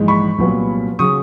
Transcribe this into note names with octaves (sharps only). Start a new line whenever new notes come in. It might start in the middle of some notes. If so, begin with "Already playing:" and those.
Already playing: A#1 G#2 E3 G#3
B5 C#6
C2 A#2 F#3 B3
C#3 F#3 C#6 D#6